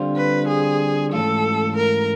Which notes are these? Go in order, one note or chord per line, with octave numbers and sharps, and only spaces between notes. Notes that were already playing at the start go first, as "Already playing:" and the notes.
Already playing: D3 G3 C4 F4
B4
G#4
G#2 E3 A3 C#4 F4 A4
A#4